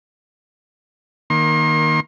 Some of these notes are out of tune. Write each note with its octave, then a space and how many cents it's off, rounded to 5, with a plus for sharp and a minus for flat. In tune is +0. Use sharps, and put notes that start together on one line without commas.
D#3 +0 A#3 +15 C6 +40